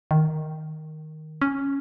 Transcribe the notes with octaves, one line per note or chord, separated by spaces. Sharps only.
D#3
C#4